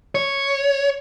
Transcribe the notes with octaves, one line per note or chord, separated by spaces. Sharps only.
C#5